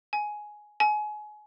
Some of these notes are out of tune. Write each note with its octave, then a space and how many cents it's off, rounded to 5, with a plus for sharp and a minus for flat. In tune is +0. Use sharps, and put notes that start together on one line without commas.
G#5 +10
G#5 +25